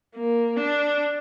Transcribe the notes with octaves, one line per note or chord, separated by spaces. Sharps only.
A#3
D4